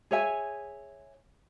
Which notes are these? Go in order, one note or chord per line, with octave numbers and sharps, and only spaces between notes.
G#4 C#5 E5 G#5